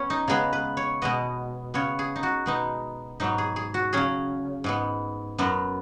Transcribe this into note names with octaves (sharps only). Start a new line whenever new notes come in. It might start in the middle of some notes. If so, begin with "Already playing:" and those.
Already playing: B3 C#4 C#5
D#4
C#3 G#3 B3 G#4
B4
C#5
B2 G#3 B3 D#5
C#3 B3 C#5
G#4
D#4
F#4
B2 G#3 B3 D#4
G#2 F#3 B3 D#4
G#4
G#4
F#4
C#3 F#3 C#4 G#4
G#2 G#3 B3
F#2 F#3 B3